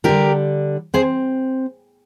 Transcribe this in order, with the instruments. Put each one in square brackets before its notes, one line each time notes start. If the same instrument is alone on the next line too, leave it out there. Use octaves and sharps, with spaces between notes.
[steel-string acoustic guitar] D3 G3 D4 G4 A#4
C4 G#4 C5